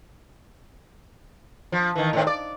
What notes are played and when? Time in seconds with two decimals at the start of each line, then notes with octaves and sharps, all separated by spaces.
1.72 F3
1.96 D#3 E3
2.13 A2 D#3 C4
2.27 D5